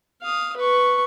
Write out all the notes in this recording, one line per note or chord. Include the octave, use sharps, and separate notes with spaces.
F5 D#6
B4 C#6